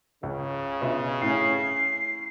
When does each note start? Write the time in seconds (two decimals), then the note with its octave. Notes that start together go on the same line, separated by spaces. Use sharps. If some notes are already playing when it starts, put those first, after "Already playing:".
0.23 C#2 C#3
0.81 B2 F4 E5
1.21 A2 C#4 C7